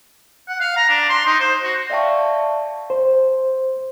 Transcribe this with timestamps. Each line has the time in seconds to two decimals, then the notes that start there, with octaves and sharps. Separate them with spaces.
0.48 F#5
0.61 F5
0.77 A#5
0.89 D4
1.09 C6
1.26 D#4
1.40 C5
1.63 F#4
1.90 D5 E5 F5 G5 A5 C#6
2.90 C5